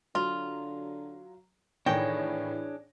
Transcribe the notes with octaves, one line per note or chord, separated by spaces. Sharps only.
D3 F#3 F4
A2 D#3 E3 D4 G#4 C#5 G5 A#6